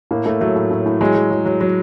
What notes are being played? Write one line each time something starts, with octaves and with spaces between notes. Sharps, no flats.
A2 A#3
A2 A3
F#3 A3
A2
A2
A2
F#3 G#3
F#3
F#3
F#3
F#3